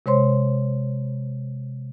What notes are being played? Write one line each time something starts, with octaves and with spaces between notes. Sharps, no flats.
C3 G#3 C5 C#5 C6